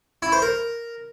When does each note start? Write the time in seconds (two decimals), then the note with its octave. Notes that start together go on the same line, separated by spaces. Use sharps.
0.22 E4
0.32 C5
0.42 A#4